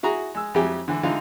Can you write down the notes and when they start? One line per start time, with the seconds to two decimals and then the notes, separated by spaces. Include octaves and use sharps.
0.03 E4 F#4 G#4 A#5
0.34 G#3 E6
0.54 F2 F#3 E4 G4 G#5
0.88 D3 E3
1.03 D3 E3 D#4 F4